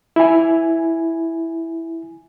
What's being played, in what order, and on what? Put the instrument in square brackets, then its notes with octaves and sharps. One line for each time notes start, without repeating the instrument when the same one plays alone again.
[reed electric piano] E4 G#5